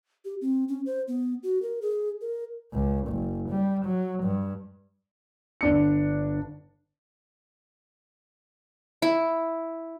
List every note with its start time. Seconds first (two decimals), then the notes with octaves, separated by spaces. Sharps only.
0.25 G4
0.41 C4
0.68 C#4
0.86 C5
1.08 B3
1.43 F#4
1.62 A#4
1.82 G#4
2.21 A#4
2.73 C#2
3.08 F#1
3.49 G3
3.84 F#3
4.23 G2
5.61 G1 D4 C#7
9.02 E4